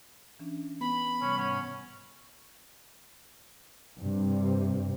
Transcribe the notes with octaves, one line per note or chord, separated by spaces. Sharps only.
E3 C#4 D4
B3 B5
C3 E3 G3 C#4
G#2 C#4 F#5
G2 C3